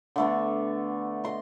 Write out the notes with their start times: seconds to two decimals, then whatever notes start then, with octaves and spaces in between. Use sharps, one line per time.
0.16 D3 A3 B3
1.24 D#5 C6